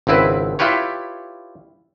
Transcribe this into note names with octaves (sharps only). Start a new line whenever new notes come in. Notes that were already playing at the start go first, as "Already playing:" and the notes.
G#1 C#2 C4 E4 B4
E4 F4 G4 B4 C#5